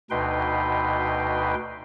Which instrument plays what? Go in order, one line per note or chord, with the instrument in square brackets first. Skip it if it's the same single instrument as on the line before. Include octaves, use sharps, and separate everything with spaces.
[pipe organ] D2 B2 D#4 B4 G5 C6